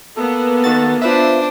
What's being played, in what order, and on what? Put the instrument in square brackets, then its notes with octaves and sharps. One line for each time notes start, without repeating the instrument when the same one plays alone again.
[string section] A#3 B3 [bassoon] A4
[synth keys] D#3 F#4 A6
[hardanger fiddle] D4 C5 [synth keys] F4 B4 E5